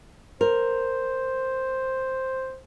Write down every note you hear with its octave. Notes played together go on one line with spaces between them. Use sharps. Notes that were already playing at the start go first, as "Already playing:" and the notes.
A#4 C5